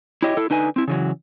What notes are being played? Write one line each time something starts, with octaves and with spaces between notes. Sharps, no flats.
E4 F#4 G4 C#5 D#5
E4 A4
D3 D#4 B4 G#5
C4 E4
C#3 E3 F#3